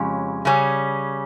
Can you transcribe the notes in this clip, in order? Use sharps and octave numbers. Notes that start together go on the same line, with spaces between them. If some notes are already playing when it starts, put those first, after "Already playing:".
Already playing: F2 C#3 G#3 C#4 G4
C#3 G3 C#4